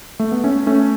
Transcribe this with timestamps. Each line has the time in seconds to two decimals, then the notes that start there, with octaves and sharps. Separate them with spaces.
0.19 A3
0.32 B3
0.44 A3 C#4
0.67 A3 C#4